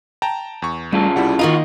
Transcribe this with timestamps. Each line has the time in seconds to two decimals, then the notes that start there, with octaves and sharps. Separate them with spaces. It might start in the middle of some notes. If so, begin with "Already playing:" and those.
0.22 G5 A5 A#5
0.62 E2 C#6
0.92 C#3 G3 A3 F4 A4
1.16 C2 G3 E4 F#5
1.39 D#3 A#3 D#4 F4 F#4 F5 D#6